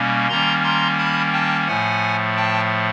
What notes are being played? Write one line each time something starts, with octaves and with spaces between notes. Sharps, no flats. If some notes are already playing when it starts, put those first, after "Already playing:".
Already playing: B2 G3 A#3 C#4
D#3 G3 A#3 C#4 A#5 C6
A#5 C6
A5 B5
G5 A5
A2 F3 A3 F#5 G#5
G5 A5